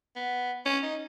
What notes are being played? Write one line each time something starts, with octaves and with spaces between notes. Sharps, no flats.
B3
C#4
D#4